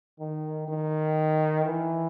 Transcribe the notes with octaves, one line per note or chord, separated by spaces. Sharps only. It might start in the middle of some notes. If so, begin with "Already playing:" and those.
D#3
D#3
E3